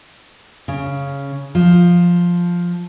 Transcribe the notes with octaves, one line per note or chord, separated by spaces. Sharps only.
C#3
F3